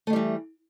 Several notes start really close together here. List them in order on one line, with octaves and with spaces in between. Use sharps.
A3 D#3 G3 E3